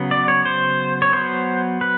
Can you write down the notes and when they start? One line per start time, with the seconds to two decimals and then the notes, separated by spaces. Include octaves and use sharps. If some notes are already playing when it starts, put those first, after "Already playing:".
Already playing: C#3 F#3 B3
0.11 D5
0.28 C#5
0.45 C5
1.02 C#5
1.13 F#3 B3 C5
1.81 B4